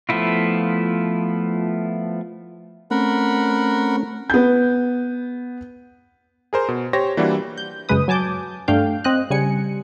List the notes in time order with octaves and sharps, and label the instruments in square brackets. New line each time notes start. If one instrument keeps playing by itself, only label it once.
[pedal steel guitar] F3 A3 B3 E4 F4
[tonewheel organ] A3 C4 C#4 [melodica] A#4 F#5 B5
[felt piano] B3 G6
[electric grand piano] G#4 A#4 C5
B2
G4 C5 C#5 A#6
E3 G3 A#3 D4 E4 F#4
[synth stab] G6
F#2 C#3 G#3 B4 D#6
F#3 G#5 A5 D6 G6
G2 A3 D4 F5 G5 G6
C4 D#5 F#6
C#3 G3 G#5 C#7